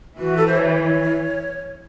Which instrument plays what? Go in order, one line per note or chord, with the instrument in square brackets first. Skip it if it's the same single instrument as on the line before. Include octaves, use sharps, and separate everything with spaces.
[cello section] E3 [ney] F#4
[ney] A4
C5
C#5